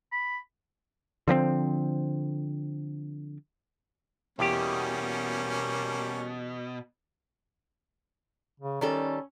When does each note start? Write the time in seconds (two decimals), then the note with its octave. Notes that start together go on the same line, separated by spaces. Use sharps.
0.12 B5
1.28 D3 F3 A#3 C4
4.39 E2 B2 G3 A#3 C#4 G4
8.60 C#3
8.81 D#3 G3 C#4 A4